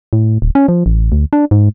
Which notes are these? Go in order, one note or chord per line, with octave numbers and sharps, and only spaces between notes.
A2
D1
C#4
F3
A1
D2
D4
G#2